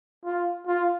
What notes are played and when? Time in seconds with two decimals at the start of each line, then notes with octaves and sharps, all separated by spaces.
0.25 F4
0.67 F4